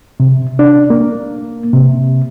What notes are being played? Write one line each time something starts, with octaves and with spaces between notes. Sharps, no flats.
C3
D4
A#3
C3